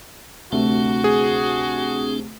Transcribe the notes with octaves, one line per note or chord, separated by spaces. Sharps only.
D2 C3 A3 C4 D4 F#4
G#4